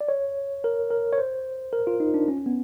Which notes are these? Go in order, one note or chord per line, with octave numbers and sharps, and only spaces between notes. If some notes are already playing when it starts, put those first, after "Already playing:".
D5
C#5
A#4
A#4
C#5
C5
A#4
F4
D#4
D4
C#4
B3